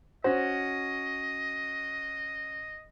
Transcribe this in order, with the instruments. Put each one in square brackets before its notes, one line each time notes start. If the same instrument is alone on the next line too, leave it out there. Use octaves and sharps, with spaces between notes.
[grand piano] C#4 F#4 [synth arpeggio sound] C5 [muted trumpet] D#5